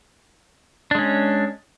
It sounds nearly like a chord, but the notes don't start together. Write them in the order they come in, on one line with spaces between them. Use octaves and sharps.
D4 G#3 C#4